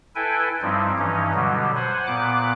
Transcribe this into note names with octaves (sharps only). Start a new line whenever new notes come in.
E4 A4 B4 G5 G#5
G2 F3 G3 C4 D#4 E4
G2 E3 C#4 D#4
B2 D3 F#3 G3
C5 F#5 G#5
A#2 B3 D6 F#6